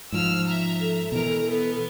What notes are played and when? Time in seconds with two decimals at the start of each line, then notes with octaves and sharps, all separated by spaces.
0.12 G#2 F3 E6 F6
0.48 E5 A#5
0.80 A4
1.12 B2 E3 A#4 A#5
1.48 B3